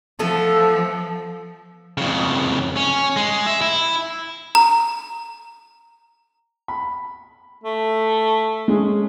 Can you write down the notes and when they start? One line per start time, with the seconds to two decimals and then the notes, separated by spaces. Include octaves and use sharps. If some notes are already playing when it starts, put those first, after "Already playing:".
0.19 F3 A3 B3 A4
1.98 F2 C#3
2.77 C#4
3.16 G#3
3.47 E5
3.61 E4
4.55 A#5
6.68 B5
7.63 A3
8.68 G#3 C#4 G#4